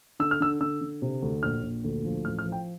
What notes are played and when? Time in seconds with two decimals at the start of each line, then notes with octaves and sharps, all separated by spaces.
0.20 D3 E6
0.31 F6
0.40 D3 E6
0.61 D3 E6
0.81 D3
1.02 C3
1.22 D2
1.43 A#1 F6
1.63 A#1
1.84 D2
2.04 F3
2.25 A1 F6
2.39 F6
2.46 F3
2.52 G5